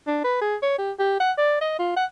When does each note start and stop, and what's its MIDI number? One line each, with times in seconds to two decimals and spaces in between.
0.07 0.22 62
0.24 0.37 71
0.41 0.56 68
0.62 0.78 73
0.78 0.92 67
0.99 1.18 67
1.20 1.32 78
1.38 1.59 74
1.61 1.76 75
1.79 1.94 65
1.97 2.05 78